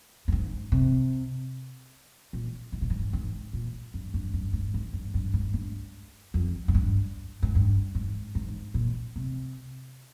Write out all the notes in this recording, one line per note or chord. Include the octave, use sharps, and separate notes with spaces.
G2
G#2
C3
A#2
G#2
A#2
G#2
G#2
A#2
G2
G2
G2
G#2
G#2
G2
G2
G#2
G2
F2
G#2
G2
G#2
G2
G#2
G#2
A#2
C3